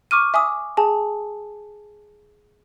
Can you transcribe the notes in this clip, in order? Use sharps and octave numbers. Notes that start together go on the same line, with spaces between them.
C#6 D6 F6 D#7
E5 G#5 D6 D#6
G#4 G#5 A5